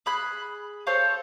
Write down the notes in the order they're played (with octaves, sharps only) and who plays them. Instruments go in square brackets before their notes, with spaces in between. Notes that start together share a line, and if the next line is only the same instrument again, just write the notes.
[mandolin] G#4 B5 F#6
A4 C5 C#5 F5